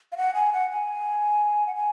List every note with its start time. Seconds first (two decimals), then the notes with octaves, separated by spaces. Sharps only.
0.12 F5
0.17 F#5
0.34 G#5
0.53 F#5
0.70 G#5
1.67 F#5
1.76 G#5